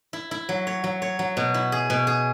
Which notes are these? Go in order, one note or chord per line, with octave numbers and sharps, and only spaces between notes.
E4
E4
F#3
C#5
F#3
C#5
F#3
B2
E4
G#4
B2
G#4